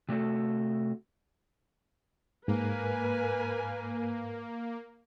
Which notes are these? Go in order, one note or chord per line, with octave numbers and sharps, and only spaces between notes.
C3 A3 F#4 A4
G#2 A#3 A#4 B4 G#5